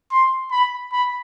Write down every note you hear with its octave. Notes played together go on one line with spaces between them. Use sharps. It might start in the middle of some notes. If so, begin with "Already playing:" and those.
C6
B5
B5